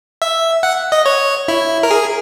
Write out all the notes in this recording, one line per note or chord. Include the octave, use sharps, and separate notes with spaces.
E5
F#5
D#5
C#5
E4
A#4
G#4